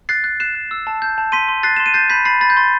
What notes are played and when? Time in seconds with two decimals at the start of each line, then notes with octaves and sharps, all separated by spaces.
0.09 F#6 A6 C7
0.24 F#6
0.40 F#6 C7 E7
0.55 F#6
0.71 E6
0.87 A5
1.02 G6
1.18 A5
1.32 C6 B6 D#7
1.48 C6
1.63 F#6 A6 C7
1.77 C6 E7
1.86 D#7
1.94 G6 A6 C7
2.10 B5 G6 B6
2.25 B5 A6 C7
2.41 B5 A6
2.50 G6
2.56 C6 A6